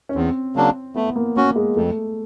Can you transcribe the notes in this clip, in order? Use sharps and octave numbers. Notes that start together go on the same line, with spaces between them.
C#4
E2 C4
C#3 F#3 A#3 D4
A3 B3
A#3
A#3 C#4 F#4
G#3
F2 A3